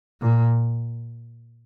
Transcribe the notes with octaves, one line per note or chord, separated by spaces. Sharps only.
A#2